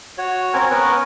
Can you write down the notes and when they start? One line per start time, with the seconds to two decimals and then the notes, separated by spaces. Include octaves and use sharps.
0.18 F#4 C#5
0.54 C4 C#4 A#4 G#5
0.70 B3 C#4 A#4 B4